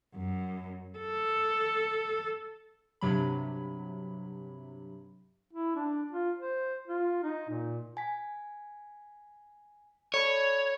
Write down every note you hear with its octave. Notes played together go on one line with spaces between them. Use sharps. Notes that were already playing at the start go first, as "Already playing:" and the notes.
F#2
A4
G2 C3 F#3 B5
E4
D4
F4
C5
F4
D#4
A#2
G#5 B6
A4 C#5 D5 B5